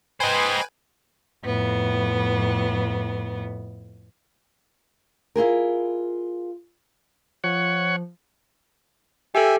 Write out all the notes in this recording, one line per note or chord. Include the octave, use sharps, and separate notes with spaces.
B4 C5 D#5 G5 G#5
F2 A2 B3
E4 F4 G#4 A#4
F3 C#5 F#5
G4 A4 E5 G5 G#5